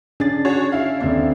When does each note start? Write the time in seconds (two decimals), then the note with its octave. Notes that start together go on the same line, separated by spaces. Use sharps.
0.20 C#4 D4 G#4 A6
0.45 F#4 G#4 C#5
0.72 E4 F5
1.00 D#1 C4 D4